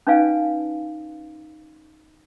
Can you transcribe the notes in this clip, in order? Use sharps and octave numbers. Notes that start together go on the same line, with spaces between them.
C#4 D#4 B4 D5 F5 G#5